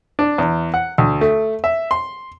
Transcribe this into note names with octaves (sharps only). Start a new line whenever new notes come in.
D4
E2
F#5
D2
A3
E5
C6